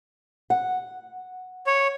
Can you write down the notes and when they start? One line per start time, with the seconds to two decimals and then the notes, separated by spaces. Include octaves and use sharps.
0.50 F#5
1.67 C#5